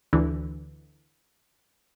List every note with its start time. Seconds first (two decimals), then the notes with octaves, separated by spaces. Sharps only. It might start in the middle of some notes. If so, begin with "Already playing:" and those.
0.13 D2 D3 E3